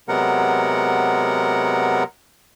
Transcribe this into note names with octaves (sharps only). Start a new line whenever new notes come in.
C3 F#3 G#3 B3 A#4 F#5